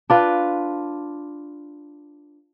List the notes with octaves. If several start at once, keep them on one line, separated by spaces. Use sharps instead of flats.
D4 F4 B4